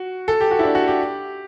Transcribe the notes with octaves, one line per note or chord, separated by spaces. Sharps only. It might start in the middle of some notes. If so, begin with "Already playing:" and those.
Already playing: F#4
A4
G4
F#4
E4
D4
F#4
G4